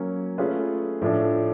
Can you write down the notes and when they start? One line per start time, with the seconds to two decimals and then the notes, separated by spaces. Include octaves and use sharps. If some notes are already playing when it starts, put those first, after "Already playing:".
Already playing: F#3 A#3 C#4
0.38 A3 C#4 F4 G#4 B4
1.02 A2 F3 A3 D4